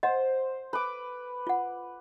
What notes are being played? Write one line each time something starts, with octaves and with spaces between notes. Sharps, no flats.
C5 D#5 F#5
B4 D6
F4 F#5